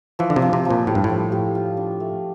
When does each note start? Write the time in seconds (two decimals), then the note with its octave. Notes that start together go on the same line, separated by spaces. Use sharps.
0.19 E3 F3
0.30 D3
0.36 C3
0.42 F3
0.53 C3
0.65 F3
0.70 A#2
0.87 A2 G4
0.95 G2
1.04 A2
1.10 F3
1.32 G4
1.55 F4
1.77 D4
2.00 A3